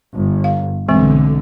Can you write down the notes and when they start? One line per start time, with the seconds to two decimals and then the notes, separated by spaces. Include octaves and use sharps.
0.14 G1
0.44 F5
0.89 B1 D3 E3 G#3 C4